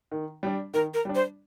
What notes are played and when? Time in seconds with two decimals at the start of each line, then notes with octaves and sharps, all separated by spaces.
0.12 D#3
0.43 G3 D4
0.74 D#3 A#4
0.94 A#4
1.05 G3 D4
1.15 C5